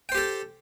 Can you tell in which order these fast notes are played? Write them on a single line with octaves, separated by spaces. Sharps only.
G5 C5 G4 A4